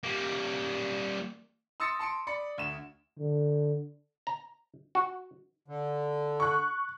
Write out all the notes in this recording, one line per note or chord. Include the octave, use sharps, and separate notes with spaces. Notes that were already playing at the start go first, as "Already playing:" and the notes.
G3 A#3
C6 D#6 E6 A6 A#6 C#7
A5 C6 C#7 D7
D5 B5 C#7
D2 E7
D3
A#5
F#4
D3
C#6 F#6